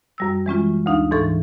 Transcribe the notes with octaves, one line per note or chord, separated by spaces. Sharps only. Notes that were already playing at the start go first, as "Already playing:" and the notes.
F#2 G3 E6
E3 G#3 C#4 F4
D2 D#4 F5
G#2 E3 A4 C#6